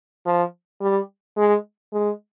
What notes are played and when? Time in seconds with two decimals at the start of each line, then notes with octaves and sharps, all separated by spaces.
0.26 F3
0.81 G3
1.38 G#3
1.93 G#3